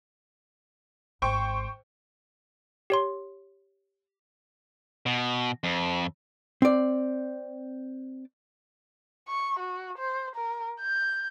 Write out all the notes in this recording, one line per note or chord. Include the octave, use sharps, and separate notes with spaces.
G#1 C5 G5 C#6
G4 C#5 C6
B2
F2
C4 D5
C#6
F#4
C5
A#4
G6